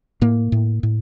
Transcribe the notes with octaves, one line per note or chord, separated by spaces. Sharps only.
A2 A#3
A2
A2